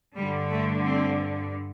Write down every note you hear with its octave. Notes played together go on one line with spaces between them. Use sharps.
G2 D3 G3
A3
C4